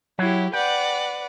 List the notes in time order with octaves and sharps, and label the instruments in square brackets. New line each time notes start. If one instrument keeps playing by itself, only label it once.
[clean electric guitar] F#3 C#5 F#5 [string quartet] E4 G4
[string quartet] B4 D5 F#5 [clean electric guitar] G5